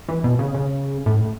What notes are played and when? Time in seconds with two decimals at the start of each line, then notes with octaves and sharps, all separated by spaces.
0.08 E3
0.24 B2
0.39 C#3
0.54 C#3
1.06 A2